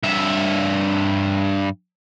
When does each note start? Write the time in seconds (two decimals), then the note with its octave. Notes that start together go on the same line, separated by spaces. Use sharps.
0.03 G2 E5